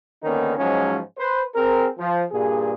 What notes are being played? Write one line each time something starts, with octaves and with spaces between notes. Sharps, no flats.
D3 D#3 A#3 B3 C#4 D#4
G#2 F3 F#3 G#3 C#4
B4 C5
C4 G#4 A#4
F3
G2 A#2 G#4